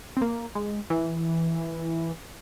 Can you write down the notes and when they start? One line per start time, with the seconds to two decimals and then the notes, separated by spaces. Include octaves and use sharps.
0.17 C4
0.21 A#3
0.55 G#3
0.90 E3